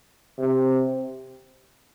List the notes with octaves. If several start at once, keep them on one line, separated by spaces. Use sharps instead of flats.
C3